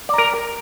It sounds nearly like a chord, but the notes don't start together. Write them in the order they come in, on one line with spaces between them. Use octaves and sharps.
D5 A#5 A#4